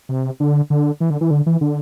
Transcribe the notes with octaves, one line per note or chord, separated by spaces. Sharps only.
C3
D3
D3
E3
D3
E3
D3
E3
D3